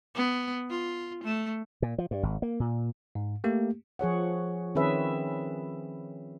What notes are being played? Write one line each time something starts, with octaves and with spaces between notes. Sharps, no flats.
B3
F4
A3
A#2
F3
G2
G#1
A#3
A#2
G#2
A3 A#3 G4
F3 G#4 C#5 F#5
D#3 C4 C#4 G#4 B4 E5